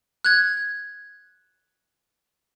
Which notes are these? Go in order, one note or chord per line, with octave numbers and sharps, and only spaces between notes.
F#6 G#6